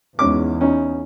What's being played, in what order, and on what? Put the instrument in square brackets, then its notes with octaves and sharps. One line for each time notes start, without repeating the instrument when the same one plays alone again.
[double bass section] E2 [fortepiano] G#2 C#4 D6
[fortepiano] C#4 D#4